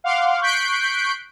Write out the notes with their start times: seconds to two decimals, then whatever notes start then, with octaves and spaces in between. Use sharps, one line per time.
0.04 F5 F#5 C6 D6
0.41 C#6 F#6 G6 B6 C7 D7